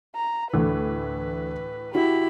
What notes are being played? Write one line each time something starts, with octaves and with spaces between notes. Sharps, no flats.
A#5
D2 A2 E3 A4 B4
E4 F#4 G4 B5